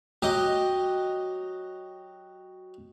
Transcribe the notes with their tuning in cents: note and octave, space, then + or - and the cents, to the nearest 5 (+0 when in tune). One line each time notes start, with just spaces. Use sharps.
F#3 +0 G4 +0 D#5 +0